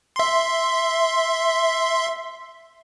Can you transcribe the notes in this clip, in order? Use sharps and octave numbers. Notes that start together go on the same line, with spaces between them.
E5 C6